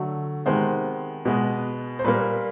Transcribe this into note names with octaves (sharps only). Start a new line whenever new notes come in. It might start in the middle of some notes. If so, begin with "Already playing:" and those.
Already playing: D3 F#3 A3
C3 D#3 G#3 B3 C5
B2 G#3 B3
C5
A#2 G3 A#3 B4